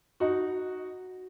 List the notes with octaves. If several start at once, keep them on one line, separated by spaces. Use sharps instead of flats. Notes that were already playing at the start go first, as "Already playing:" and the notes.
D#4 F#4